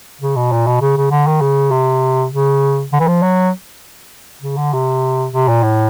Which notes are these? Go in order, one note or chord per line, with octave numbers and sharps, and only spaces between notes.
C#3
B2
A#2
B2
C#3
C#3
D3
D#3
C#3
C3
C#3
D3
E3
F3
F#3
C#3
D3
C3
C3
A#2
A2